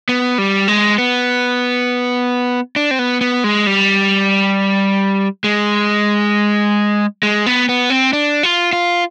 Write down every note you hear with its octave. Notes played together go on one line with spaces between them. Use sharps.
B3
G3
G#3
B3
D4
C4
B3
B3
G#3
G3
G#3
G#3
B3
B3
C4
D4
F4
F4